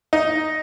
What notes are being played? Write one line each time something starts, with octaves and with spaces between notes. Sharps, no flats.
D#4